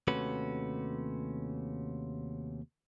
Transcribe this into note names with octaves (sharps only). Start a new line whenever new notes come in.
D#2 C3 A3 C#4 F#4 B4